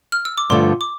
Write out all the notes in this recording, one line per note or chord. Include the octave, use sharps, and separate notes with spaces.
F6
E6
D6
G2 D3 F3 A3 C6
D6